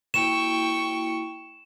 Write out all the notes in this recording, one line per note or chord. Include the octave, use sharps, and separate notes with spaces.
A#3 E4 F#4 G5 C#6 E7